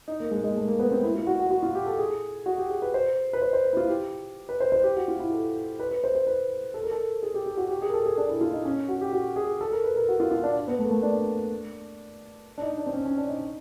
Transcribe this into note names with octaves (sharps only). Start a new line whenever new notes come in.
D#4
A#3
G#3
G#3
A3
A#3
B3
C4
E4
F4
F#4
F#4
F#4
F4
G4
A4
G#4
F#4
G4
G#4
B4
C5
B4
C5
C5
B4
E4
F4
G4
B4
C5
C5
G4
F#4
F4
E4
A4
B4
B4
C5
C5
B4
A4
A#4
A4
G#4
G4
G4
F#4
G4
G#4
A#4
A4
G#4
D4
E4
F4
D#4
C#4
F#4
G4
F#4
G#4
A4
A#4
B4
A#4
F#4
F4
F4
D4
B3
A3
A#3
A3
D4
D4
D#4
D4
C4
C#4
C#4
D4
D#4